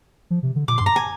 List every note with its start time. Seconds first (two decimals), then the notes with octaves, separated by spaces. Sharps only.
0.30 F3
0.43 C3
0.56 D3
0.68 A#2 D6
0.78 G2 C6
0.86 A#5
0.96 G#5